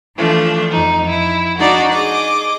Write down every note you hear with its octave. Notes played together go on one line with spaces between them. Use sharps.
E3 F3 A3 D4
F2 D#4
E4
D4 D#4 F#4 D5
G#4 D#5 D6